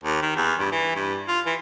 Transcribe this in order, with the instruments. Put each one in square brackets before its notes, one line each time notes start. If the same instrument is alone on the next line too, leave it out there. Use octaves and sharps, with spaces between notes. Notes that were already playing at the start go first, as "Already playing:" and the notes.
[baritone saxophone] D#2
D#3
E2
G2
E3
G2
F4
E3